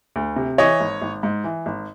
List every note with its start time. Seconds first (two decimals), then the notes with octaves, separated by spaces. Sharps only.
0.16 D2
0.36 C3
0.58 E3 C#5 D#5
0.80 G#1
1.02 G#1
1.23 G#2
1.44 E3
1.66 G#1